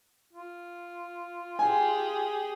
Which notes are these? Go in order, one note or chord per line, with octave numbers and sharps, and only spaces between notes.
F4
G4 G#4 G#5